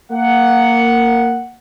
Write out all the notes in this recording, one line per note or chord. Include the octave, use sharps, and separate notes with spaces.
A#3 F#5